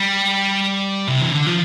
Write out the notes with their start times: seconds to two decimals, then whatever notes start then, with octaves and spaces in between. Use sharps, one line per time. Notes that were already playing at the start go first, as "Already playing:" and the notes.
Already playing: G3
1.08 C3
1.22 E3
1.31 D3
1.47 F3